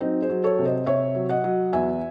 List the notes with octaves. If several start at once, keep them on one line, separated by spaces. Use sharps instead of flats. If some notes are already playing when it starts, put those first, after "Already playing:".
F#3 C4 D#4
G#4 C5
F#3
A4 C#5
C3
C5 D#5
C3 C#5 E5
F#3
D#5 F#5
F#3
E2 E5 G#5